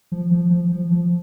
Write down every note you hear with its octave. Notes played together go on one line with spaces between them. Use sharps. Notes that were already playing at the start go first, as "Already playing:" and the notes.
F3
F3
F3
F3
F3